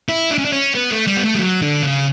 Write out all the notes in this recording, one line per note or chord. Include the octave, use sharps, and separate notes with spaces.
E4
D4
C#4
D4
C#4
B3
A3
G3
B3
A3
G3
F#3
D3
C#3